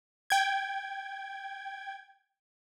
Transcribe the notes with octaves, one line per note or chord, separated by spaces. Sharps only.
G5 G#6